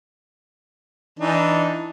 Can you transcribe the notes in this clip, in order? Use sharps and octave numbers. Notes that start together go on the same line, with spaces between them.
E3 D4 D#4